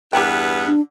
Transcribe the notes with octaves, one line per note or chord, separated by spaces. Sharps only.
E2 G2 B3 G4 A#4 G5
D4